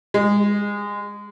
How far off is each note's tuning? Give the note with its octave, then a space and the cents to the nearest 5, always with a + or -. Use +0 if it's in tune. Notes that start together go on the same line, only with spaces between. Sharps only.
G#3 -20